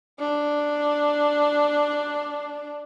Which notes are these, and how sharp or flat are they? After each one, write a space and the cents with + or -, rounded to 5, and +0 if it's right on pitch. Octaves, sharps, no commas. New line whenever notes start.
D4 +5